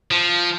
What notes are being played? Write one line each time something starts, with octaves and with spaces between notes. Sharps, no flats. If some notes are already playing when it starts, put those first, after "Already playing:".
F3